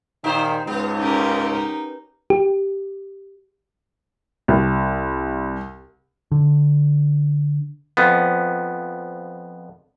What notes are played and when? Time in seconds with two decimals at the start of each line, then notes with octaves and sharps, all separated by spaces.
0.24 A#2 D#3 D#4 G4 C5
0.67 C#2 G#2 B3
0.98 C#4 D#4 G4 A#4
2.30 G4
4.48 C2
6.32 D3
7.97 F2 F3 B3